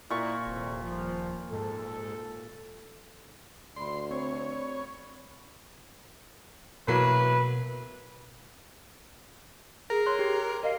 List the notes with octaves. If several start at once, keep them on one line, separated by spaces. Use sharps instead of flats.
A#2 D#4 E4 C#6
D#1 F2 C3
F3
G#2 A4
D2 D5 B5 C6
C4 C#5
B2 E3 F#3 A#3 B4
G#4 A#4 A#6
C#5 C6 F#6
G4
A#4 D#5 F5 C7